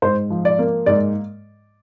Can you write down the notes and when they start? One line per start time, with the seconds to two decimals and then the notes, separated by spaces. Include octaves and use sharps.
0.02 G#2 C5
0.30 F3
0.45 D5
0.59 A#3
0.86 G#2 D5